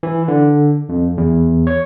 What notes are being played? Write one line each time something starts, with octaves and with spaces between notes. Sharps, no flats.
E3
D3
F2
E2
C#5